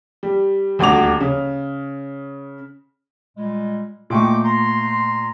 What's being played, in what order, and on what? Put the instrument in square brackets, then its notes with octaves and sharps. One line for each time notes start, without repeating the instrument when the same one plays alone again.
[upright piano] G3
D#1 D2 F#4 D6 F7
C#3
[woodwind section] A#2 G3 G#3
[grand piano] A#2 A3 C#6 [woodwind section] G#3 G5 D6
[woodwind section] A#5 C6